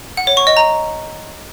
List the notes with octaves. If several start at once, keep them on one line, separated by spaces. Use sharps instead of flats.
F#5
C#5
C#6
D#5
A#5